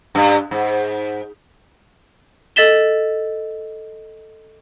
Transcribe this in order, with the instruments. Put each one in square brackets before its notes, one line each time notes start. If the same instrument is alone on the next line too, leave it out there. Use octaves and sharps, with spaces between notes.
[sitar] G2
G#2
[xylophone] A4 D#5 A6 B6 E7 G7